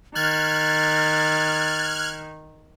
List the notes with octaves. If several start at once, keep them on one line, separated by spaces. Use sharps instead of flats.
D#3 F6 F#6 G#6 A6